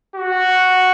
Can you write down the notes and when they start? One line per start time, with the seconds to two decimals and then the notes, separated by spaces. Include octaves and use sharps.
0.16 F#4